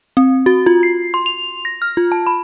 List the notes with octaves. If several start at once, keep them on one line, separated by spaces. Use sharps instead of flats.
C4
F#4
F4
C7
C6
F7
A#6
F6
F4
A5
B5